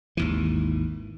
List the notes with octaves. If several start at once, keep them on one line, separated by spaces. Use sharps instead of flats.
G#1 D#2 E3